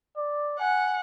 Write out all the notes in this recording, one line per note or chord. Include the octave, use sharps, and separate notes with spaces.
D5
F#5 G#5